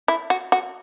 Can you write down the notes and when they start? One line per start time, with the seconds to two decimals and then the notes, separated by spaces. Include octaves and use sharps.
0.08 E4
0.30 F#4
0.52 F#4